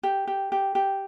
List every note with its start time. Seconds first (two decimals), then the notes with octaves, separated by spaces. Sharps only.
0.03 G4
0.28 G4
0.52 G4
0.75 G4